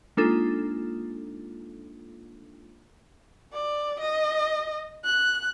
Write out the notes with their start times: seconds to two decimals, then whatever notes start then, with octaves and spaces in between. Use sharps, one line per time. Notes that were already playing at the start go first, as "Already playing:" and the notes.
0.17 G#3 A#3 D4 D#4 F4 A4
3.53 D5
4.00 D#5
5.05 F#6